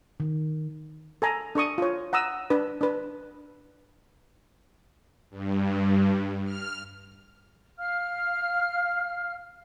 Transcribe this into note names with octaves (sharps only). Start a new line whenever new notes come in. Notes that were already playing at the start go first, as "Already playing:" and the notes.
D#3
A4 G#5 A#5
D4 A4 C#6 D#6
F4 C#5
F#5 A#5 D#6 E6
D4 B4
D4 B4
G2
F6
F5 F6